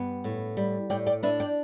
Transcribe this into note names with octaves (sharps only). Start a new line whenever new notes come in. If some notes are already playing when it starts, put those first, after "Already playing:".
Already playing: G2 B3
A2
G3
A2 D5 G5
D5 G5
D4 B4 E5
D5 G5